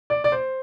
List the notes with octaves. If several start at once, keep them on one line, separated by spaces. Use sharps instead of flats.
D5
D5
C5